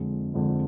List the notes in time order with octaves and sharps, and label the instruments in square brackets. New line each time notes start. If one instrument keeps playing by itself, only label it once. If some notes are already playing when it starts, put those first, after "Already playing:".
Already playing: [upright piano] F2 D3 G#3
F2 D3 G#3